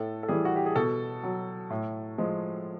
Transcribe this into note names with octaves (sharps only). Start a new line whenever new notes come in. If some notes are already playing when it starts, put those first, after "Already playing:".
Already playing: A2 A4
A4
E3 G3 G#4
F#4
G4
G#4
B2 A4
F#3
A2
F3 G#3